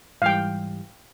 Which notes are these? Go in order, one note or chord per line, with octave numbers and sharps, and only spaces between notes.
G#2 E3 G3 F5 G5